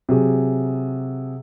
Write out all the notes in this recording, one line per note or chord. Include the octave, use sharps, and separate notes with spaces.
C3 F#3 G#4